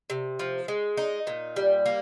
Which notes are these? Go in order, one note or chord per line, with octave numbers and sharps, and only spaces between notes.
C3
F3
G#3
D#4
A#2
G3
A#3